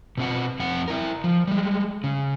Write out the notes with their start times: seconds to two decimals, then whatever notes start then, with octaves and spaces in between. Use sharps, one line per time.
0.18 B2 C4 F#5
0.60 F2 C4 F#5
0.88 E4 A#4
1.24 F3
1.48 G3 G#3
2.04 C#3